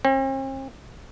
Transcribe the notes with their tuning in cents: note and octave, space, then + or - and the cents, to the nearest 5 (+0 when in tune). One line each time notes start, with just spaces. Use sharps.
C4 +45